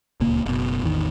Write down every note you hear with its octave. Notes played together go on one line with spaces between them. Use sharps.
D1 C#2 A#2 A#3
F#1 B2
A1 E2 D#3